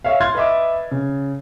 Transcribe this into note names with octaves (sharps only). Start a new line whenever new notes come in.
C#5 E5 F5
C6 F6 G#6 A6
B4 D#5 E5 D6
C#3